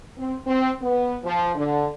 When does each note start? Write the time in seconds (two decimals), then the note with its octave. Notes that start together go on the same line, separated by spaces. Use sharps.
0.17 C4
0.47 C4
0.81 B3
1.25 F3
1.55 D3